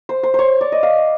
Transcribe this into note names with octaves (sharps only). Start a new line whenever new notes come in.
C5
C5
C5 C#5
D5
D#5
F5